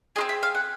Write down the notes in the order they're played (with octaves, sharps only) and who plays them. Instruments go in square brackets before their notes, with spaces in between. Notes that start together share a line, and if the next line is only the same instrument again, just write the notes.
[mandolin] C4 F4 G#4 D#5
E5
F5
F#5